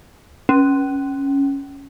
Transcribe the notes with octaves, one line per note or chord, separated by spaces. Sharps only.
C#4